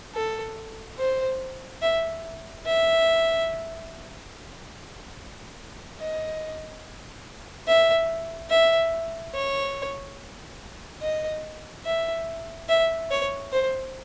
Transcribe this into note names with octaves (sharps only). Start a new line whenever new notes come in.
A4
C5
E5
E5
D#5
E5
E5
C#5
D#5
E5
E5
C#5
C5